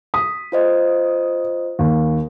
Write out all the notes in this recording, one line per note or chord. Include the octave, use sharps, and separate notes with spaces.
D#6 B6
F4 C5 D#5
D#2